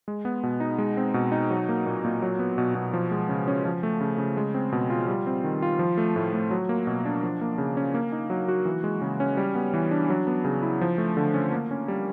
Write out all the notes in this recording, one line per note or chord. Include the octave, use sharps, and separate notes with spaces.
G#3
B3
B2
D#4
G#3
C4
B2
D#4
F#3
A#3
A#2
A#2
F#3
B3
B2
B2
F3
G#3
C#3
C#4
F3
A3
C#3
C#3
G#3
C4
B2
F4
G3
C4
D#3
F4
F3
A3
A2
A2
F#3
A#3
B2
D4
F3
A#3
C#3
C#4
A#3
D#4
F#3
F#4
E3
G#3
C#3
C#4
G3
B3
E3
D4
F#3
B3
C#3
E4
F3
A3
D3
C#4
A#3
C#4
G3